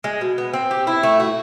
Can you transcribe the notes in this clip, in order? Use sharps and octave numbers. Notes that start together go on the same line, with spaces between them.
G#3
B2
B3
C4
G4
E4
A3
F#4